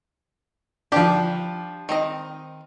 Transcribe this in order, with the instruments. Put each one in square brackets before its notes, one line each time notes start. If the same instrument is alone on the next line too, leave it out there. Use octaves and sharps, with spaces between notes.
[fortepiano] F3 D4 [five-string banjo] G3 G4
[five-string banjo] D#3 C4 D#5